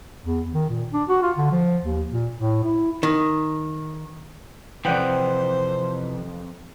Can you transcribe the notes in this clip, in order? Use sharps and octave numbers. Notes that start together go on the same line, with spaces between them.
E2
D#3
A#2
D4
F#4
F4
D3
F3
D#2
A#2
A2
E4
D#3
F2 C3 E3 C5 D5 F#5 G5